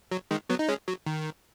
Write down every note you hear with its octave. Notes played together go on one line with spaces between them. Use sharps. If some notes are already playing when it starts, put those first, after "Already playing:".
F#3
D#3 G#3
F#3 B3
D#4
G#3 C#4
F#3
D#3